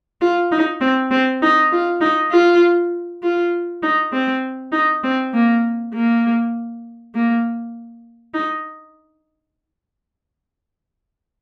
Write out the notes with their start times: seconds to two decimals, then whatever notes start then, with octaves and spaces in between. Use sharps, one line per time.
0.21 F4
0.52 D#4
0.81 C4
1.11 C4
1.42 D#4
1.72 F4
2.01 D#4
2.31 F4
3.23 F4
3.83 D#4
4.13 C4
4.72 D#4
5.04 C4
5.34 A#3
5.94 A#3
7.14 A#3
8.34 D#4